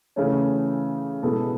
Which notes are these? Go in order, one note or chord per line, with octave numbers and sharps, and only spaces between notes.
C#3 E3 A3 C#4
B2 G#3 B3 E4 A4